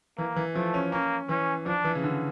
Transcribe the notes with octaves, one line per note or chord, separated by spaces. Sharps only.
E3 A#3
E3
F3 A3
C#4
A#3 C#4
E3 C#4
F3 D4
E3
C#3
D3